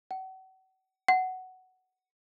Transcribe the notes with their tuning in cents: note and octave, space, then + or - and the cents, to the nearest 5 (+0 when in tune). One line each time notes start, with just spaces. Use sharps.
F#5 +40
F#5 +10